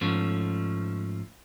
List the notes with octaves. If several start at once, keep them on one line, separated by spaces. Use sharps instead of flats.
G#2 F3 A3 C#4